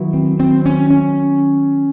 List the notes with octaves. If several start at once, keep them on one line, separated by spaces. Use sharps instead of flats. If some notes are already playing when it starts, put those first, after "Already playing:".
Already playing: D#3 F#3 B3 E4
C4
C4
C#4
C#4